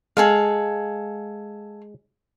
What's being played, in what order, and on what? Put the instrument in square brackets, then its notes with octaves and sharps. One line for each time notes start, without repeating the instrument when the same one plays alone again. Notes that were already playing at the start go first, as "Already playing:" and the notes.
[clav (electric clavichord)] G#3 [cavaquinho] G#4 A4 F5